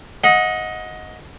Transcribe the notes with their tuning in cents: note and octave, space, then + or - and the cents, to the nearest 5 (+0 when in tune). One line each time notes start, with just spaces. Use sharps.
D#5 +15 F#5 -25